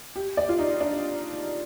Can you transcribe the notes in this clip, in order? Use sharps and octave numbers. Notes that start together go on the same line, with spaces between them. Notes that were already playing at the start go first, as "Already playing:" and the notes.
G4
D5
F4
D#4
D4